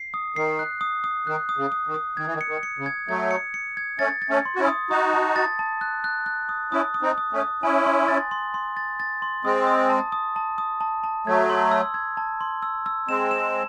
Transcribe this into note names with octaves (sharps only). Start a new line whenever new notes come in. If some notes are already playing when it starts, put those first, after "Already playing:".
Already playing: C7
D#6
D#3 C7
F#6
D#6
D#6
D#3 F#6
D#6
C#3
D#6
D#3
D#6
D#3 G#6
E3
D#3
C#7
D#3
C#7
C#3
G#6
F#3 A3 G#6
C#7
C#7
G#6
A3 C#4 A6
A6
A3 C#4
C6
F#4
C#4 E4
D#6
D#4 F#4 D#6
A5
A6
A5
F#6
F#6
F#6
D#6
C#4 E4 D#6
D#6
C4 D#4
D#6
A3 C#4
D#6
C#4 E4 G#5
C6
A6
C6
C6
A6
A6
C6
G#3 C4 D#6
D#6
A5
D#6
A5
D#6
A5
A5
F#3 A3 G#6
C6
E6
G#6
A5
C6
E6
E6
G#3 C4 E7
E7